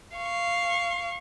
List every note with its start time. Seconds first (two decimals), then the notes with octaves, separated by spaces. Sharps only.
0.17 F5 C#6